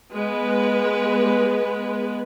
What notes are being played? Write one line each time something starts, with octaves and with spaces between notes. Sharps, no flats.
G#3 B3 B4